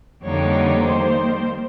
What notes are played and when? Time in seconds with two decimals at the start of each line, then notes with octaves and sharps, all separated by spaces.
0.23 F2 D3 G3 A#3 D#4 C#5
0.83 D#3 G3 A#3 C5